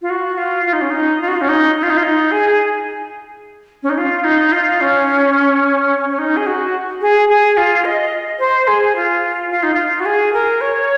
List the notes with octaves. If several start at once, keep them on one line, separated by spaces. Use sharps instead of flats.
F4
F#4
F4
F4
D#4
C#4
D#4
F4
F#4
F4
C#4
D#4
D#4
F4
D#4
F4
D#4
G#4
C#4
D#4
F4
D#4
F4
C#4
C#4
D#4
G#4
F#4
G#4
G#4
F4
D#5
C5
G#4
F4
F4
D#4
F4
F#4
G#4
A#4
C#5